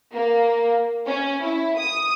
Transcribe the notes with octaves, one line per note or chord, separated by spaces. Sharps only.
A#3
C#4
E4
D#6